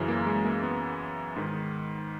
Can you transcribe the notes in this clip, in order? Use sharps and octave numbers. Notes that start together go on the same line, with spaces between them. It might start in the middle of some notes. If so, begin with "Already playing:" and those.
Already playing: F#2 C#3 E3
A#3
G#3
A#3
B3
G#2 D#3